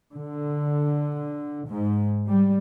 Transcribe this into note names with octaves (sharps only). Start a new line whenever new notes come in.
D3
G#2
G3